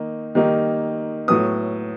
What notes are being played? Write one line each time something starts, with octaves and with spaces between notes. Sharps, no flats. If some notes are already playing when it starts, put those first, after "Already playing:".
Already playing: D#3 A#3 D#4
D#3 G3 A#3 D#4
A2 F#3 B3 D#6